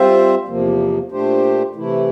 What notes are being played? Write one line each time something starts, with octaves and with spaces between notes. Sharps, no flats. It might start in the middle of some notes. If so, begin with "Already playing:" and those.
Already playing: G3 C4 F4 C5 E5
E2 C3 F3 A#3
A#2 A3 D4 G4 C5
C3 E3 A3 E4